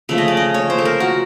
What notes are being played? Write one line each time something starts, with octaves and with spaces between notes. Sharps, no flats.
C#3 F3 A3 E5
D#5
D5
D#5
C#5
C5
A4
A#4
F#4